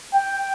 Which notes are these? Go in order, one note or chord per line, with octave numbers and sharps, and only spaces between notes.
G5